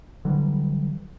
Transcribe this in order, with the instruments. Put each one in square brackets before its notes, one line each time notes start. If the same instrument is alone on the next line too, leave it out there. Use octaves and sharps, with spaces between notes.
[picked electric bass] D3 E3 F#3 G3